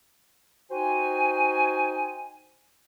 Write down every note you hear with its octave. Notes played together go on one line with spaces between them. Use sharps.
D#4 F#4 C5 G5 G#5